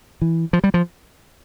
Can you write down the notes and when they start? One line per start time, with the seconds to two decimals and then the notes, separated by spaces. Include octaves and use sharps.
0.22 E3
0.53 F3
0.64 G3
0.74 F3